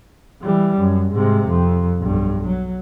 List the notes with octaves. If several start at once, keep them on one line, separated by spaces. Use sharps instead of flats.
E3 G3
F#2
G#2 C3
F2
B1 G2
F#3